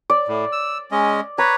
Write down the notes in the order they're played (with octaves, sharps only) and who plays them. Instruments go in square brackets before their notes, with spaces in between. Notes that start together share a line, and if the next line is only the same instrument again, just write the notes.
[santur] D5
[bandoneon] A2
E6
G#3 C#4 D#5
[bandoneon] B4 C#5 [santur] A#5